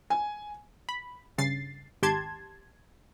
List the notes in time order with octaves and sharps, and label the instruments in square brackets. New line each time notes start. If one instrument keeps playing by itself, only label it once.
[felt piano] G#5
[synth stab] B5
G2 C#3 A6 C7
G#1 G4 A5 C6 G#6